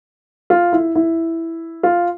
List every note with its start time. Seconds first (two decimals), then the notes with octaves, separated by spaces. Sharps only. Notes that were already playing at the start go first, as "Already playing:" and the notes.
0.50 F4
0.72 E4
0.95 E4
1.83 F4